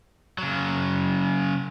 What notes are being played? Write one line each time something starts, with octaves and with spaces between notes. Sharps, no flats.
C#3 F#3